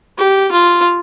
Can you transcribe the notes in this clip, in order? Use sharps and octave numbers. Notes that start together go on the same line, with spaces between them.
G4
F4